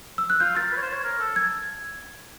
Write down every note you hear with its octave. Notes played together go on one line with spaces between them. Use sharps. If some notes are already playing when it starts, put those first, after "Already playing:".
E6
F#6
F4 G6
A#4 A6
B4
C#5
C5
C#5
A#4
A4
G#6